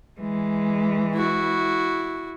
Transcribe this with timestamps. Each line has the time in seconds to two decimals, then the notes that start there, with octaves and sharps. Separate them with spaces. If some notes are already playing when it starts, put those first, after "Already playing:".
0.20 E3 G#3
1.14 E4 F#4